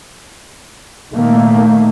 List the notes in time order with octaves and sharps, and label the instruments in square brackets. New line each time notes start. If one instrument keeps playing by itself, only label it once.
[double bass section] A#2 D#3 A3 A#3